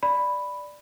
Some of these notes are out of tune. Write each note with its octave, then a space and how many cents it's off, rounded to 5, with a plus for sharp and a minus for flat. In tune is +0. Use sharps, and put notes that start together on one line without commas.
D5 +5 B5 +0